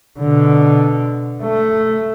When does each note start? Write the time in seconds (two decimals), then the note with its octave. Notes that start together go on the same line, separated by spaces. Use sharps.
0.19 B2 D3
1.43 A3